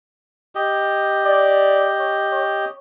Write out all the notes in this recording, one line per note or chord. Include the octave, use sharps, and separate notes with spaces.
G4 D#5
D5
C#5
C#5